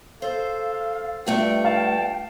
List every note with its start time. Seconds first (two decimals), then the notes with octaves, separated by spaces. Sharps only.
0.22 A4 C5 F5
1.26 G2 A3 F4 G5
1.65 F5 A5